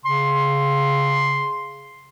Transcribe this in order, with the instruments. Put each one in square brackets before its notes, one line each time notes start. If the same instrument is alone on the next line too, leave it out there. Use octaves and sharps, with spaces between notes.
[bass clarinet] C#3 [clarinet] C6